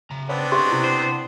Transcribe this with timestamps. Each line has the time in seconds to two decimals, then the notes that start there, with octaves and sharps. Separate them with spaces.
0.11 C#3 A#5
0.29 B3 C4 D4 C#5
0.52 G4 C5 D#5 C6
0.72 C3 E4
0.84 C5